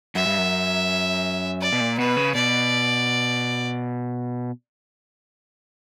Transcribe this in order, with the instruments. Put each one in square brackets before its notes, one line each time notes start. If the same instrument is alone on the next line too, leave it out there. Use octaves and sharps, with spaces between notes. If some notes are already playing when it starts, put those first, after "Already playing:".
[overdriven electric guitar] F#2 [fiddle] E5
[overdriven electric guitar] G2
F#2
[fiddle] D5
[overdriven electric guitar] B2
A#2
[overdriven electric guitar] B2 [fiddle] B4
[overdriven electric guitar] C#3
[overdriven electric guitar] B2 [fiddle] D5